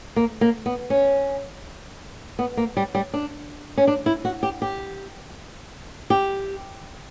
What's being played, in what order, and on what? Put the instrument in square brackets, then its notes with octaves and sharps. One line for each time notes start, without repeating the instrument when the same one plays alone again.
[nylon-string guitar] A#3
A#3
B3
C#4
B3
A#3
G3
G3
D4
C#4
D4
E4
F#4
G4
G4
G4